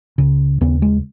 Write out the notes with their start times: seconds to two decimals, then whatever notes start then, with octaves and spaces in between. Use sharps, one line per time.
0.18 C#2 C#3
0.61 D#2 C#3 B3
0.82 G#3